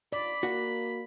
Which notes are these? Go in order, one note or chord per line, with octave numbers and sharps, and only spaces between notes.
D#2 F4 D5 B5
A#3 F#4 F#5